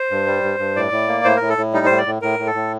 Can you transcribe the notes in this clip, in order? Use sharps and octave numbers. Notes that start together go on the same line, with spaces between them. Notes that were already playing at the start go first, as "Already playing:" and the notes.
Already playing: C5
G2
G3
G2
G2
A2 D5
A2
A#3
A2 C5
A2 A#4
A4
A2
G3 D#4
A2 C5
D5
A2
A2 A#4
A2
A4
A2